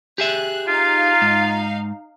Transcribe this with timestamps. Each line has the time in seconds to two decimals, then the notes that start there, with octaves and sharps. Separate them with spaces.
0.18 G4 G#4 E5 F#6
0.68 D#4 F4 F5
1.22 G#2